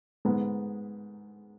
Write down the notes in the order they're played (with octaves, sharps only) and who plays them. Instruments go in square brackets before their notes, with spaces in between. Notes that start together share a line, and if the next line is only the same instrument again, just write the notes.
[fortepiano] G#2 G#3 B3